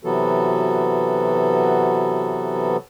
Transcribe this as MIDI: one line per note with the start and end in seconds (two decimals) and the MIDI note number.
0.04 2.77 48
0.04 2.77 52
0.04 2.77 54
0.04 2.77 59
0.04 2.77 66
0.04 2.77 69